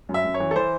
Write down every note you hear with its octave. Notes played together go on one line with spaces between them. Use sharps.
F#2
E5
F#2
C#5
E3
A4
E3 C5